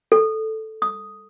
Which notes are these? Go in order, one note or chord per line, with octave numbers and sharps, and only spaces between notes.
A4
D#6